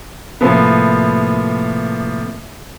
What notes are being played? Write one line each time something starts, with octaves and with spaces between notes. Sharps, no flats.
A2 C3 F3 A#3 B3